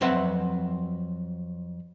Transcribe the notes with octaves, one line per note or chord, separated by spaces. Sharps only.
F2 F#3 C4 B4 E5 F#5